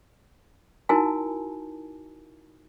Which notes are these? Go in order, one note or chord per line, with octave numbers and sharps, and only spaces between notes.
D#4 E4 F#4 A#4 G#5 A5